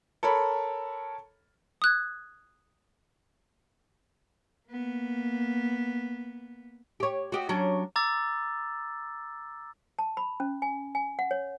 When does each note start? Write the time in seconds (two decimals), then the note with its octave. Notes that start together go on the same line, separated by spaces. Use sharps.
0.23 A4 A#4 C#5 B5
1.82 D#6 F#6 G#6
4.69 A#3 B3
7.00 G4 C#5
7.32 F#4 G4 D#5
7.49 F#3 C#4 D4
7.96 A#5 D6 E6 A6
9.99 A5
10.17 B5
10.40 C#4
10.62 G#5
10.95 G#5
11.19 F#5
11.31 C#5